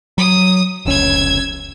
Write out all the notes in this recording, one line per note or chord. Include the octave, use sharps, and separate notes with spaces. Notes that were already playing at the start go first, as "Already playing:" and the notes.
F#3 D#6
F1 C#2 C#4 E6 G#6